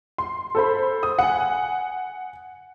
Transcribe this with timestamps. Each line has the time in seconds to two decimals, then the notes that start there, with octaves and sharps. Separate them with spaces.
0.18 C6
0.55 A4 C5 B5
1.03 D#6
1.19 F#5 G#5